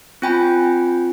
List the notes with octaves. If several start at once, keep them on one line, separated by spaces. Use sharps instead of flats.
C4 F4 G5 G#5 B5